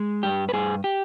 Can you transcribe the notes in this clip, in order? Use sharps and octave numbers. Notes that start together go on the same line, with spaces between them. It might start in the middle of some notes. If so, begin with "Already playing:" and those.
Already playing: G#3
G2 G4
B4
G2 G#4
G4